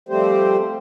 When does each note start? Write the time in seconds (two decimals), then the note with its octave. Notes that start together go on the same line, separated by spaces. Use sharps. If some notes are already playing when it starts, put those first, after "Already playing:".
0.09 F3 G3 A3 C4 G4 C5